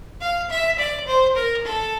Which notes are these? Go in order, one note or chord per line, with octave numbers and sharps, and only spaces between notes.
F5
E5
D5
C5
A#4
A4